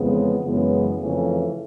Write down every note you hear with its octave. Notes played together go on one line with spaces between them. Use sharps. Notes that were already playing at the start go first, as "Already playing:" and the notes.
Already playing: F2 C#3 E3 G#3 B3
F#2 C#3 E3 G#3 B3
F2 C#3 E3 A3 C#4